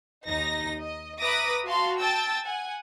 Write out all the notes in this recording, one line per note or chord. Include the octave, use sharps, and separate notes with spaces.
D#2 D#4 A#6
D#5
B4 E5 A#5 D6 D#6 A#6
F#4 F5 A5 C6
G5 A5 E6 A6
F#5 G#5